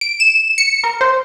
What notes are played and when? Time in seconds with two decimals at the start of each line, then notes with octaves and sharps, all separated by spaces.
0.01 D7
0.20 E7
0.58 C#7
0.84 A#4
1.01 C5